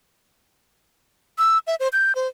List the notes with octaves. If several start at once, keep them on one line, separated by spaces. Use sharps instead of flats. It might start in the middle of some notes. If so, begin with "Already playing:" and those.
E6
E5
C5
G6
C5